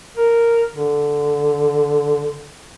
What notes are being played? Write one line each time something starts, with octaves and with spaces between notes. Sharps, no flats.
A#4
D3